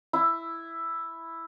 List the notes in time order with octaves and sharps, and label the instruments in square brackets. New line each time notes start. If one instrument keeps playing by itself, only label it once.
[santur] E4